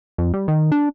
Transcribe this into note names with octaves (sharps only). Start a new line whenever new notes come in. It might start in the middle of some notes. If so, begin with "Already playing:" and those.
F2
G3
D#3
D4